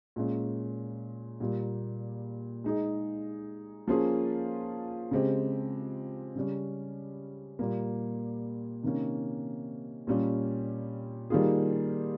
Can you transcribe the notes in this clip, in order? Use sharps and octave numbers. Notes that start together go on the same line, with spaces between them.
A#2 G#3 C#4
A#2 G3 A#3
G#3 D#4 G#4
F3 A#3 C#4 F4 G#4
C#3 G#3 C4 G4
C#3 G3 C#4
A#2 G3 A#3
C3 D#3 A#3 C#4
A#2 G3 C#4 G4
D#3 G3 A#3 F4 G#4